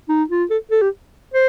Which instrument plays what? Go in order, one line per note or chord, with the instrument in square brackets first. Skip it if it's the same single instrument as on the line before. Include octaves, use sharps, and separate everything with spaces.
[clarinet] D#4
F4
A4
A4
G4
C5